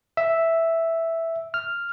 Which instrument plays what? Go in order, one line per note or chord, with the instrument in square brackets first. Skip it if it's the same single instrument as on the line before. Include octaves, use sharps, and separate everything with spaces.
[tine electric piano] E5
F6